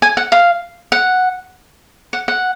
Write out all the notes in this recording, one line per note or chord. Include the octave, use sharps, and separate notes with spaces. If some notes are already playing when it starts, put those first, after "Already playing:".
G#5
F#5
F5
F#5
F#5
F#5